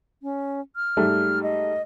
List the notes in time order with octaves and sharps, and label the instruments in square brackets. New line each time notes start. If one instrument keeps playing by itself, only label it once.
[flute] C#4
F6
[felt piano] G#2 G3 A3
[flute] D#5